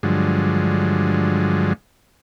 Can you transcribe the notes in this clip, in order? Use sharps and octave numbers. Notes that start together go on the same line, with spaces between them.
G2 D3 F3 F#3 G#3